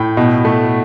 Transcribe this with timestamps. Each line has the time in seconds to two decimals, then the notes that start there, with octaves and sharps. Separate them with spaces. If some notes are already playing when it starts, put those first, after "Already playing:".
Already playing: A2 G5
0.17 B2
0.45 A3